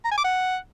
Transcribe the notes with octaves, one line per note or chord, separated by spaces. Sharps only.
A#5
G#5
D6
F#5